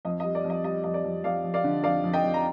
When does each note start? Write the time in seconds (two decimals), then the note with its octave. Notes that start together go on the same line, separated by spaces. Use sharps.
0.05 F2 D#5
0.20 D#5
0.24 G3
0.35 D5
0.44 F2
0.50 D#5
0.64 G3 D#5
0.84 F2 D#5
0.94 D5
1.04 F2
1.24 F2 D5 F5
1.44 F2
1.54 D5 F5
1.64 D3
1.83 F2 D5 F5
2.04 F2
2.13 D#5 G5
2.24 F2
2.34 A#5